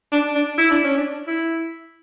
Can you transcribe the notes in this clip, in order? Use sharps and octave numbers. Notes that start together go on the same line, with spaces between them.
D4
D4
E4
D4
C#4
D4
E4